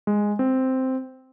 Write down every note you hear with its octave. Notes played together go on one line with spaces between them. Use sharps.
G#3
C4